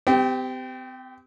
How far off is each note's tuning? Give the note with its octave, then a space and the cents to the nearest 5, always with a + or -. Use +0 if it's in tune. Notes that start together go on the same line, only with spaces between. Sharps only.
C4 -40 G4 +0